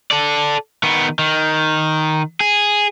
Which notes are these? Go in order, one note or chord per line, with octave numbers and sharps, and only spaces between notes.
A4 D5
D#3 B3
D#3
G#4